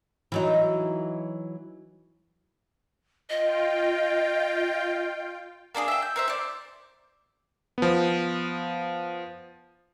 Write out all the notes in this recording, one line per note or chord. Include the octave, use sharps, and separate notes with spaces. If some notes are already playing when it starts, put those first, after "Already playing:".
E3 F#3 D#4
F4 D#5 G5
A#3 D4 F4 G#4
E5 G5
G6
A#4 C5 E5
C5 D5
F3 B3